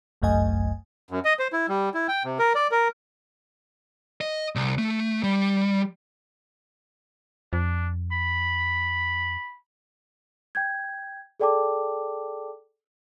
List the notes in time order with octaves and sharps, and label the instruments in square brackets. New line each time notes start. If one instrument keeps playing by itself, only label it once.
[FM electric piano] G1 C2 F#2 A3 D#5 G#5
[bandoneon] F#2
D#5
C5
E4
G3
E4
G5
C3
A#4
D5
A#4
[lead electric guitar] D#5
C2
A3
G3
[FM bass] F2 [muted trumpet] D4
[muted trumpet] B5
[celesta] G5 G6 G#6
G#4 A4 D5 G5 A5 D6